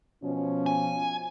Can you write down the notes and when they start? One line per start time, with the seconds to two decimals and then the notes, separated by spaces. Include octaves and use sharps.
0.24 B2 F3 C#4
0.66 G#5